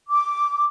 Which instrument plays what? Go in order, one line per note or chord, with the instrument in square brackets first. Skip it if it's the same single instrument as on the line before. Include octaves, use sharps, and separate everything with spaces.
[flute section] D6